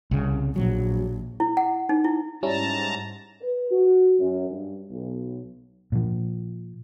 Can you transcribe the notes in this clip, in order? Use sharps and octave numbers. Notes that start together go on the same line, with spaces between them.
C2 C#3
A#1 F#3
E4
F#5
D#4
E4
G#2 G3 C#4 E4 A5 A#5
B4
F#4
F#2
G2
B1
A#2 F3